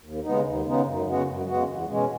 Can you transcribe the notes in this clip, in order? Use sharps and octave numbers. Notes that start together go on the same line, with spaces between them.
D#2
C#3 G#3 B3 D#4
D#2
C#3 G#3 B3 D#4
F#2
C#3 G#3 B3 F#4
F#2
C#3 G#3 B3 F#4
E2
B2 G#3 C#4